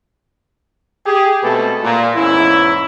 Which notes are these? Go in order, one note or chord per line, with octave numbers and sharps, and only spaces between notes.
G4 G#4
B2 G#3 A3 C4 A4 B4
A#2
E2 G#2 C#4 E4